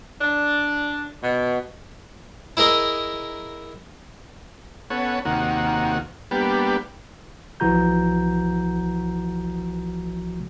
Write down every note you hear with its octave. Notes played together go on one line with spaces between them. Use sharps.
D4
B2
E4 G#4 A#4 D#5 E5
B3 C#4 A4 C#5 F#5
D#2 C3 D#3 A#3 F#4 F#5
G3 A#3 B3 D4 G4 B4
B1 E3 F3 F#4 A#5 G6